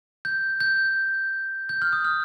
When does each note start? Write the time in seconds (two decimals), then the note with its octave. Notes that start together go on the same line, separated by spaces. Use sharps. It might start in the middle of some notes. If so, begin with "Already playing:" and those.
0.25 G6
0.60 G6
1.69 G6
1.82 F6
1.93 D#6
2.05 F6